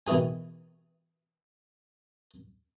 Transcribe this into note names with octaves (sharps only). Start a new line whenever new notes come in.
B2 D#3 E3 G#4 G#5